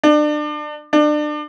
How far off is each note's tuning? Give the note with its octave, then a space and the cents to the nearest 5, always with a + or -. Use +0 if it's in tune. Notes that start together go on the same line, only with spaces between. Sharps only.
D4 +30
D4 +30